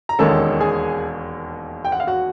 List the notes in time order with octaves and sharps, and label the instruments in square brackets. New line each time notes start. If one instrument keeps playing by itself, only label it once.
[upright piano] A#5
E1 D#2 D#3 G#3 C#4 A4 A5
G#4 G#5
G5
F#5
F5
F#4 F#5